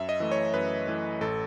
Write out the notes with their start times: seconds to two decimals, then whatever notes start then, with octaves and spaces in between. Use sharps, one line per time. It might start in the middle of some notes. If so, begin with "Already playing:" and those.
Already playing: F#2 E5
0.09 D#5
0.20 E3 A3
0.32 C#5
0.54 F#2 B4
0.87 E3 A3
1.21 A1 A4